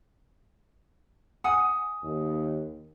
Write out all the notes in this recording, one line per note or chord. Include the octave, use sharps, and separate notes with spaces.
F#5 G#5 D#6
D#2